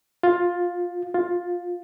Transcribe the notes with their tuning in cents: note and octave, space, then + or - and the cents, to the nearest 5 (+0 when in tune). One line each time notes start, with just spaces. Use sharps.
F4 +10
F4 +10